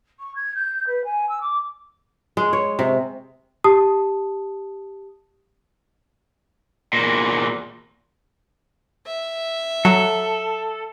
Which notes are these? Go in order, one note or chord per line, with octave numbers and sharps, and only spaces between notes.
C#6
G#6
G6
B4
G#5
E6
D6
G#3
C#5
C3
G4 A5 D#6
E2 A#2
E5
F#3 A4